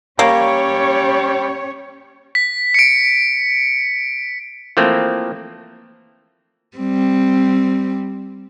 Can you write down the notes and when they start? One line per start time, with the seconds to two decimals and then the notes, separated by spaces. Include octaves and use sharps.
0.19 G3 A#3 C#4 C#5
2.35 B6
2.74 C#7 D7
4.77 E3 F3 A3 A#3 C4
6.77 G3 C4